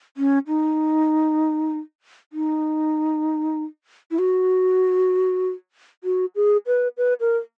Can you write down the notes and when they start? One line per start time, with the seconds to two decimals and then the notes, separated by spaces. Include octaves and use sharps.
0.17 C#4
0.47 D#4
2.33 D#4
4.11 E4
4.19 F#4
6.04 F#4
6.35 G#4
6.66 B4
6.97 B4
7.20 A#4